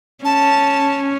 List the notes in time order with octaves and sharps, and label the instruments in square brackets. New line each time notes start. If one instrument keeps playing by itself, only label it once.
[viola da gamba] C#4 [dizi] A5